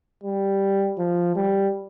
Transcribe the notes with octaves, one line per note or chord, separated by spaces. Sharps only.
G3
F3
G3